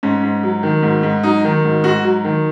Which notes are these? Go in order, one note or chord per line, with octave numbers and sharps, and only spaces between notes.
G#2 C#4
G#2
F#3
D#3
G#2
G#2
F#3 D#4
D#3
G#2
G#2 F#4
F#3
D#3